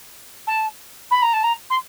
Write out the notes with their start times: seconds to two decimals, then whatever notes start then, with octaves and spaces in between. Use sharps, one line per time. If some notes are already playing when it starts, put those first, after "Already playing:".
0.47 A5
1.11 B5
1.22 A#5
1.33 A5
1.43 A#5
1.70 C6